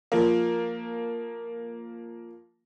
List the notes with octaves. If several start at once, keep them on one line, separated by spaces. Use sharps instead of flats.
F3 A#3